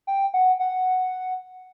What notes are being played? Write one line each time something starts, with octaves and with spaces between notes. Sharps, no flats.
G5
F#5
F#5